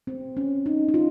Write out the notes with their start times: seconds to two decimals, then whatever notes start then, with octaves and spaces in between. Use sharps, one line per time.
0.07 C4
0.37 C#4
0.66 D#4
0.89 D#4
0.94 F4